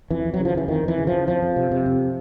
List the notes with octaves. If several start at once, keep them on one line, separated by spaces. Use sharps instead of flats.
F2 E3
F2
F#3
C#3
F3
C#3 E3
F2 D#3
F2 E3
C#3
F3
C#3
F2 F3
F2
C3
C3
F2